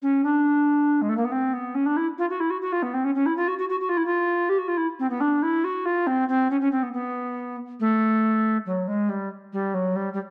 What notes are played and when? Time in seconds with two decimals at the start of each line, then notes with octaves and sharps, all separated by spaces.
0.02 C#4
0.24 D4
1.02 G#3
1.09 A3
1.17 A#3
1.25 B3
1.32 C4
1.53 B3
1.75 C#4
1.86 D4
1.97 E4
2.18 F4
2.29 F#4
2.40 E4
2.50 F#4
2.61 F#4
2.72 F4
2.83 B3
2.94 C4
3.04 C#4
3.15 C#4
3.26 E4
3.37 F4
3.48 F#4
3.58 F#4
3.69 F#4
3.80 F#4
3.89 F4
3.97 E4
4.06 F4
4.49 G4
4.58 F#4
4.68 F4
4.77 E4
4.99 C4
5.10 B3
5.20 D4
5.42 E4
5.64 F#4
5.85 F4
6.07 C4
6.29 C4
6.50 C#4
6.61 C#4
6.72 C4
6.83 B3
6.93 B3
7.80 A3
8.66 F#3
8.88 G#3
9.09 G3
9.53 G3
9.74 F#3
9.96 G3
10.13 G3